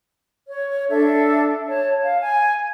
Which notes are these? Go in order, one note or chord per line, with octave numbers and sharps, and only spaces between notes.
C#5
D4 A4 E5
C#5 A5
F5
G#5